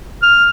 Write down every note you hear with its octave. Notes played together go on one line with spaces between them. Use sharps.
F6